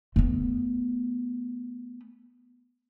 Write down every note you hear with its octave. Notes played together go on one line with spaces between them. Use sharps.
A3 B3